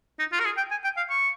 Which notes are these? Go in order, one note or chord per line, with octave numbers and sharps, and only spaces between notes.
D#4
F4
A#4
G#4
G5
G#5
G5
F5
C#6